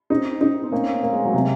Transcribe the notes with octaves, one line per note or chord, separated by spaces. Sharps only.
C4 D#4
D#4
C4
A#3 C#4
C4
A#3
G#3
F#3
C3 G#3